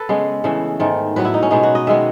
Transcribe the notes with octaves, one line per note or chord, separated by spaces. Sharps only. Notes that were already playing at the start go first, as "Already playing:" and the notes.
Already playing: A4 B4
C#3 G#3 B3
C#3 E3 A3
G#2 D#3 A3
A2 F#3 B3 B4
E4
D#4
C#4
B2 G#3 B3 D#4
F#4
D#5
D#3 G#3 B3 E5